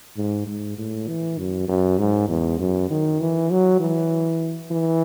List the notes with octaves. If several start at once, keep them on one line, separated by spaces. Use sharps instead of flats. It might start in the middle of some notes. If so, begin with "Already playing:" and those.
G#2
G#2
A2
E3
F#2
F#2
G#2
E2
F#2
D#3
E3
F#3
E3
E3